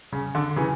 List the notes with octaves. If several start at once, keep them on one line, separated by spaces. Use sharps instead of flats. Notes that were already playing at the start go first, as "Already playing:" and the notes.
C#3
D3
C#3 E3